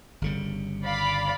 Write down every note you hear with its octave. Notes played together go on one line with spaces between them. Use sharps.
G1 C#3 G3
D5 F5 B5